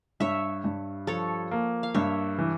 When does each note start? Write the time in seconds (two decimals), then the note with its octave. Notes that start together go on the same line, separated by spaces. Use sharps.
0.20 G2 C#5 E5
0.64 G2
1.07 F3 A4 C#5
1.51 A#3
1.83 F5
1.94 G2 C#5 E5
2.38 E3